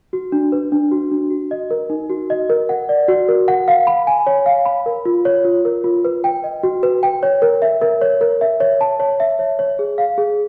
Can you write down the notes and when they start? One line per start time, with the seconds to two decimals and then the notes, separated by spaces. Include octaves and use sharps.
0.13 F#4
0.32 D4
0.52 B4
0.72 D4
0.91 F#4
1.11 D4
1.30 F#4
1.51 D#5
1.71 A#4
1.90 D#4
2.10 F#4
2.30 D#5
2.50 A#4
2.69 F#5
2.89 D5
3.08 F#4
3.28 A#4
3.48 F#5
3.68 F5
3.87 B5
4.07 G#5
4.27 C#5
4.46 F5
4.65 B5
4.86 A#4
5.05 F4
5.25 C#5
5.45 F4
5.65 A#4
5.84 F4
6.05 B4
6.24 G5
6.44 D#5
6.63 F#4
6.83 B4
7.03 G5
7.23 C#5
7.42 A#4
7.62 E5
7.81 A#4
8.01 C#5
8.21 A#4
8.41 E5
8.60 C#5
8.81 A5
9.00 C#5
9.20 E5
9.39 C#5
9.59 C#5
9.79 G#4
9.98 F5
10.18 G#4